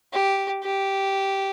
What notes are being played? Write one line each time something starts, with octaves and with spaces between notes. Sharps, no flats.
G4
G4